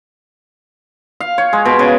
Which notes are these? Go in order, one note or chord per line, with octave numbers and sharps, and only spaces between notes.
F5
C#5
G#3
B2
C#3